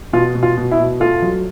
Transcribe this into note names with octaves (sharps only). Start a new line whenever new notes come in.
B2 F4
B2
F4
B2
E4
B2
A3 F4
F#3